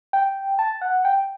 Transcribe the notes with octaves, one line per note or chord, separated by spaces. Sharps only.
G5
A5
F#5
G5